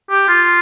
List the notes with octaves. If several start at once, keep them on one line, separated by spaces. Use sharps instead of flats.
G4
F4